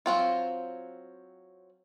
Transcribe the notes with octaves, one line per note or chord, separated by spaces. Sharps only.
F#3 C4 F4